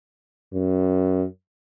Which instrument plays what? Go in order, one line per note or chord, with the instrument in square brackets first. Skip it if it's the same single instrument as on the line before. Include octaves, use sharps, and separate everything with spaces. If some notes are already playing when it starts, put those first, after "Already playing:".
[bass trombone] F#2